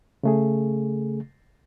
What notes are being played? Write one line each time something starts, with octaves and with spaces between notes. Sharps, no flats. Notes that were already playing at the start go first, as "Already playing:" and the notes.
C#3 A3 G#4